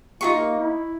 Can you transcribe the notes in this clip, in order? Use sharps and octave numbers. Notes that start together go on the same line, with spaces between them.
D#4 F4 G#4 C#6
A#3
E4